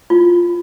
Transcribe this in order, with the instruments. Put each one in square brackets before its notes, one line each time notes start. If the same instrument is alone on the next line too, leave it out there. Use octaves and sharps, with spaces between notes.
[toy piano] F4